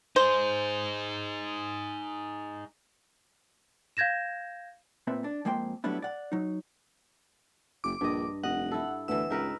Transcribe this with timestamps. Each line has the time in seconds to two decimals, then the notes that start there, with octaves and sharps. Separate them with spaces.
0.16 D#4 G#4 C5
3.97 F5 G6 G#6 A#6 E7
5.07 A#2 C4 B4 E5
5.24 D4
5.45 F2 G#3 A#3 C5 G5 C6
5.84 F#3 G3 A3 B3 D4 E4
6.02 D5 F#5
6.32 F#3 D#4
7.84 F#1 D6
8.01 A#1 G2 D#5
8.43 F1 D#5 F#5
8.71 E4 A4
9.08 D2 E3 B3 E6
9.30 C#2 D#4 A#4 B4